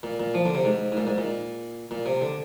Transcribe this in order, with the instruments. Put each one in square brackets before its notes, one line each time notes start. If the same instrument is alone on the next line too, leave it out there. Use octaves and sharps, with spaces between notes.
[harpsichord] A#2
A#2
F3
D3
C3
G#2
G#2
A#2
G#2
A#2
A#2
C3
D3